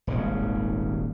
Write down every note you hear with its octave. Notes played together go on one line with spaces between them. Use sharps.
D#1 G#1 C#3